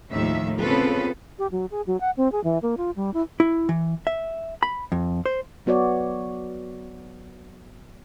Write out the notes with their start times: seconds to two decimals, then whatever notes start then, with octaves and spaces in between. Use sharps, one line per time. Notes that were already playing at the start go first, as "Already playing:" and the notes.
0.12 D#2 A2 D#3 F3 E5
0.59 C#3 B3 C4 F4 A4 B4
1.39 G4
1.52 F#3
1.71 G#4
1.87 F#3
2.00 F#5
2.17 C4
2.32 G#4
2.44 E3
2.62 A#3
2.77 F4
2.96 G3
3.14 E4
3.40 E4
3.69 E3
4.07 E5
4.63 B5
4.92 F2
5.26 C5
5.66 F#3 B3 F#4 C#5 D5